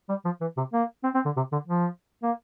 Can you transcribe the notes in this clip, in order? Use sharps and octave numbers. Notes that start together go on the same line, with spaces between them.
G3
F3
E3
C3
A#3
C4
C4
D3
C3
D3
F3
A#3